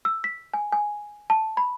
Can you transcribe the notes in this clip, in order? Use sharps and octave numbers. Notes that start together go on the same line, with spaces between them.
E6
B6
G#5
G#5
A5
B5